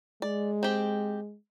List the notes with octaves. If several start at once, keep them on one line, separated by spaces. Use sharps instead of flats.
G#3 D5
C4 G4